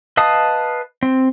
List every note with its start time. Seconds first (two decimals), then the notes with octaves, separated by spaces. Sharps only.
0.17 B4 D#5 F5 A5 D#6
1.03 C4